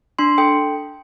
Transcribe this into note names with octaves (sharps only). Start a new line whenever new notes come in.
D4 C6
A4 G5